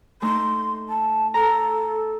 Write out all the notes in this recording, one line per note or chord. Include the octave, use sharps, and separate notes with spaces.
A3 D#4 C6
A5
A4 A#5